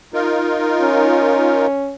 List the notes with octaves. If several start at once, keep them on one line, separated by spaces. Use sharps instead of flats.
D#4 F4 A#4
C#4